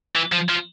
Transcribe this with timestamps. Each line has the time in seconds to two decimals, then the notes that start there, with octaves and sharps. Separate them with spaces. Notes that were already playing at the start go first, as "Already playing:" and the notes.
0.15 E3
0.32 F3
0.49 F3